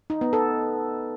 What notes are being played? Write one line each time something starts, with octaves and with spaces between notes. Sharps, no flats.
D#4
B3
A4